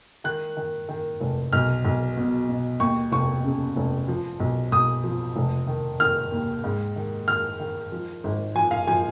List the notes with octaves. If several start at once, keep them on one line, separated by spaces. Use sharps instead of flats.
D#3 F#6
D#3
D#3
F1
B1 F6
B1
B2
B2
D#2 C#6
F1 C#6
C#3
F1
F3
B1
B1 D#6
F3
F1
D#3
D#3 F6
D#2
G#2
D#3
D#3 F6
D#3
F3
G#1
F3 G#5
F5
F3 G#5